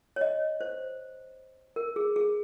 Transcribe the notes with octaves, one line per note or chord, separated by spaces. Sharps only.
C#5
D#5
C5
A#4
G#4
G#4